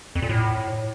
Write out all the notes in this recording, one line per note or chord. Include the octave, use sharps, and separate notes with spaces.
F2
A#2
A2